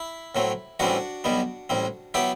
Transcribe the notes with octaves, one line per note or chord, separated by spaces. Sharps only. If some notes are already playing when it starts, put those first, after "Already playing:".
Already playing: E4
A2 F#3 A3 C4
A1 A2 E3 G3 C4 D4 F#4
B1 B2 G3 B3
A1 A2 G3 C4
F#3 B3 E4 G4